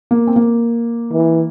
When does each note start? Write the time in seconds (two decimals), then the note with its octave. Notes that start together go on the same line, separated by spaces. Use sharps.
0.11 A#3
0.27 C4
0.36 A#3
1.12 E3